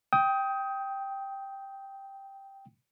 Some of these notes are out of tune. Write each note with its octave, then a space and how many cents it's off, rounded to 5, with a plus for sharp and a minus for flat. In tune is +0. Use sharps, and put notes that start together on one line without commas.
G5 +0 D#6 +25